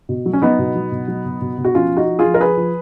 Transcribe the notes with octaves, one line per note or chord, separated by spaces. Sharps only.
B2
F#3
C#4
F#3 B3 D#4
B2
F#3
B2
F#3
B2
B2
B2
F#4
F3 C#4 F4
F3
D#4 F#4
F3
F4 G#4
F3
A#4
F3 G#4 B4
F3